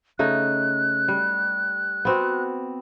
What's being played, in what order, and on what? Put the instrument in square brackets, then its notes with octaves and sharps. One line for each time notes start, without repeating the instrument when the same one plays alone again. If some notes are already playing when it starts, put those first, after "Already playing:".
[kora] C#3 A3 D#4 [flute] F#6
[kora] G3
B3 C4 F#4